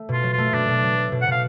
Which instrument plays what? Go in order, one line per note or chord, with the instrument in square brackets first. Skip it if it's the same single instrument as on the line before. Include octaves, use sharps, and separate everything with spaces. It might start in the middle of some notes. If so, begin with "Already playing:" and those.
Already playing: [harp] A3
[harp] B2 [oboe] F4
[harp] F#3
[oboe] F4
[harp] A3
[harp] B2 [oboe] D4
[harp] B2
F#3
A3
B2
[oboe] F#5
[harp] B2 [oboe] F5